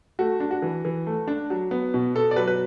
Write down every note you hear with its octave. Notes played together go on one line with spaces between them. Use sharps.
A3 F#4
D4
F#4
E3
E3
A3
D4
F#3
B3
B2
B2 A4
D5
F#3 B4
B4